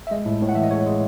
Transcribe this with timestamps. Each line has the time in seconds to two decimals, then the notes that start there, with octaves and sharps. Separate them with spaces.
0.07 E5
0.11 G#3 D#5
0.26 A2
0.42 A2
0.49 F#5
0.55 E3 E5
0.64 D#5
0.71 G#3 C#5
0.86 G#3